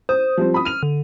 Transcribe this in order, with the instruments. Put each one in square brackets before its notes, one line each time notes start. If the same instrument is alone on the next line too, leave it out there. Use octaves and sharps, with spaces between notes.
[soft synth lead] C5 [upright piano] D#6
[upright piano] F3 G3 C4
B5 D#6
[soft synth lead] F6 [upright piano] D#7 F7
[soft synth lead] D3